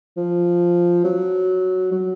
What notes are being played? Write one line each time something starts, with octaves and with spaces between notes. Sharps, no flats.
F3
F#3
F#3